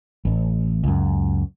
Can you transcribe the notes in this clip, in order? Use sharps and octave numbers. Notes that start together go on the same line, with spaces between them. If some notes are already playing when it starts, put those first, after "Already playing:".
A1
C#2 F#2